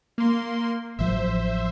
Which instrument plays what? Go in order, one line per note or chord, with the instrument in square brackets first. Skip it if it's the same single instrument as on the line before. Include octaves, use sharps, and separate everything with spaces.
[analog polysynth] A#3 C6
[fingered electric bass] A1 F3 F#3 [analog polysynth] C5 E5